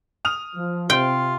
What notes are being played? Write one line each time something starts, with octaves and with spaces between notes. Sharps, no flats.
D#6 F6 F7
F3
C3 F4 G5